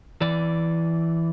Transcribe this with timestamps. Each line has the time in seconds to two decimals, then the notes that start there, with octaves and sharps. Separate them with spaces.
0.21 E3 D5